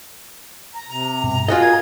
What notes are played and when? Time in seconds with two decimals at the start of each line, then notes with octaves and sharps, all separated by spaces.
0.75 A#5
0.89 C3 A#5
1.24 G2 B2
1.48 F4 F#4 G#4 D#5
1.62 A#4 A#5 G#6